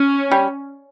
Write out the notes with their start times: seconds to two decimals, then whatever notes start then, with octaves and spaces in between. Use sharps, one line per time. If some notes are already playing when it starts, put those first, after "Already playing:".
Already playing: C#4
0.31 G3